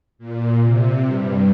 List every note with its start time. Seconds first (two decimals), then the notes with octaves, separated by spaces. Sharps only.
0.19 A#2
0.62 C3
1.06 G2